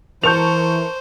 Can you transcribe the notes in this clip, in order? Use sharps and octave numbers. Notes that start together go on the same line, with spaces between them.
E3 A#4 C5 A5 C#6 G6 F7